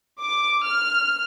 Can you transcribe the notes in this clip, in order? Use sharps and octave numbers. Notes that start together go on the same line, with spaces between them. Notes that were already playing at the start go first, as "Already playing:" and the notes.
D6
F6